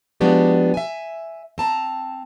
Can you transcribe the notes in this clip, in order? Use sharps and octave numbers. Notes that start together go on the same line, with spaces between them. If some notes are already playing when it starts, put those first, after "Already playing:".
F3 G#3 B3 D4 F#4 G4
E5 G#5
C4 A5 A#5